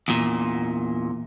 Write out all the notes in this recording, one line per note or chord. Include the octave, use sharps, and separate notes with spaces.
E2 A#2